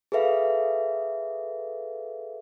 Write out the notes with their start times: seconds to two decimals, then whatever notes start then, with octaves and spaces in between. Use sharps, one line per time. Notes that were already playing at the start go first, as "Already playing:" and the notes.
0.12 G#4 A4 B4 E5 F5